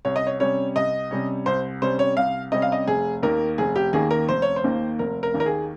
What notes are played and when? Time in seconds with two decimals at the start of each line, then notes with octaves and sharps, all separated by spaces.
0.05 C2 C#5
0.16 D#5
0.27 C#5
0.40 C3 G3 C#4 C#5
0.76 C2 D#5
1.11 C3 G3 C#4
1.46 C2 C5
1.82 C3 G3 C#4 C5
1.99 C#5
2.17 C2 F5
2.52 C3 G3 C#4 D#5
2.62 F5
2.72 D#5
2.87 F1 G#4
3.23 D#2 D#3 A#3 A#4
3.58 F1 G#4
3.76 G4
3.93 D#2 D#3 A#3 G#4
4.11 A#4
4.29 F1 C5
4.42 C#5
4.56 C5
4.64 D#2 D#3 A#3
4.99 F1 A#4
5.23 A#4
5.34 D#2 D#3 A#3
5.40 A#4
5.46 G#4